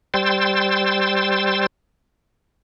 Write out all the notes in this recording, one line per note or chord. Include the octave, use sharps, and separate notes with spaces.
G3 C5 G5 C6 E6 A6